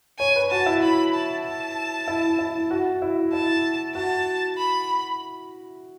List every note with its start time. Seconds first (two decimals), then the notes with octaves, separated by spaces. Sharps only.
0.19 C#5 G#5
0.36 B4
0.51 F#4 A5
0.66 E4
0.82 B5
1.14 A5
1.45 A5
2.08 E4
2.39 E4
2.71 F#4
3.02 E4
3.33 E4 A5
3.95 F#4 A5
4.58 B5